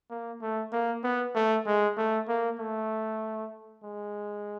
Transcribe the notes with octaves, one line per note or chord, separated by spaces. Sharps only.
A#3
A3
A#3
B3
A3
G#3
A3
A#3
A3
G#3